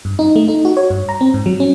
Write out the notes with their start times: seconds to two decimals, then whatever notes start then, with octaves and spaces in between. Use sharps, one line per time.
0.05 G2
0.19 D#4
0.36 A3
0.48 D#4
0.65 F#4
0.77 C#5
0.90 G2
1.09 A#5
1.21 C4
1.34 G#2
1.46 F#3
1.60 C#4